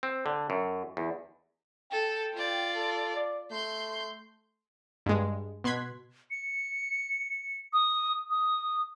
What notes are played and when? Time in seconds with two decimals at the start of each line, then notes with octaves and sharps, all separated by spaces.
0.03 C4
0.26 D3
0.50 F#2
0.97 E2
1.91 A4 G5
2.34 F4 D5
2.75 A4
3.16 D5
3.51 A3 C6 G6
5.06 G2 G#3
5.64 B2 C6 F#6 G#6 B6
6.31 C#7
7.73 D#6
8.30 D#6